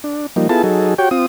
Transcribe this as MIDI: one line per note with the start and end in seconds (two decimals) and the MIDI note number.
0.04 0.27 62
0.36 0.48 53
0.36 0.48 55
0.36 0.48 58
0.36 0.48 63
0.49 0.62 59
0.49 0.62 64
0.49 0.62 65
0.49 0.62 68
0.49 0.62 69
0.49 0.62 81
0.63 0.94 54
0.63 0.94 63
0.63 0.94 68
0.63 0.94 69
0.98 1.09 66
0.98 1.09 67
0.98 1.09 73
0.98 1.09 79
1.11 1.26 60
1.11 1.26 65
1.11 1.26 87